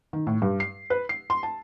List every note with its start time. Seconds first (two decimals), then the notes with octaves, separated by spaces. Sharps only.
0.13 D#3
0.27 A2
0.42 G2
0.60 C7
0.90 B4
1.09 C7
1.30 C6
1.43 A5